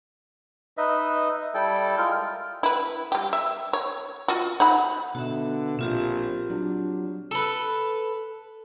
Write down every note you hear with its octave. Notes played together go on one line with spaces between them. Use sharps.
D#4 B4 D#5 E5
G3 E4 A4 G5
G#3 F4 A#4
E4 B4
G3 G4
E5
C#5
F4 F#4
D#4 F#5 B5
B2 D3 F#4 E5
A#1 A#2 C4 F4 G4
F#3 D4
A4 B4